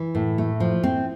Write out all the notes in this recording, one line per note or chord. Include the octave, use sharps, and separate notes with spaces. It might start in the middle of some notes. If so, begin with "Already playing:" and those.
Already playing: E3
A2
A3
F3
C4